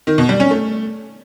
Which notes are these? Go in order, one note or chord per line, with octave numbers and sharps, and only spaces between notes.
D#3
B2
G3
C#4
A3